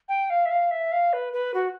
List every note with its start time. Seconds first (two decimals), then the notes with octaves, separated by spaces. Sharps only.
0.09 G5
0.30 F5
0.46 E5
0.51 F5
0.71 E5
0.92 F5
1.13 B4
1.33 B4
1.54 F#4